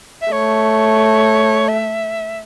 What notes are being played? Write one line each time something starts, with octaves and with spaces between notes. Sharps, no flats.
E5
A3 C#5
E5